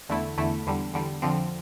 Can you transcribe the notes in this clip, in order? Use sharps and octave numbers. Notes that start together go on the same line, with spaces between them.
E2 D3 A3 E4
E2 D3 A3 E4
E2 D3 G3
E2 D3 G3
F2 D3 F3 C4